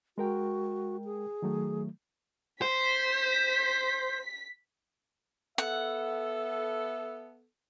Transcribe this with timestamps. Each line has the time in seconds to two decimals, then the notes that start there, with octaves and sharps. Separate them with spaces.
0.18 G#3 F#4 A#4 G5
1.05 G#4
1.42 D#3 F#3 A3
2.62 C5 B6
5.58 B3 A4 E5 F#5